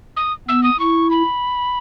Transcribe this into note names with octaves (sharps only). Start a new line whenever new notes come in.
D#6
B3 E6
D#6
E4 C#6
B5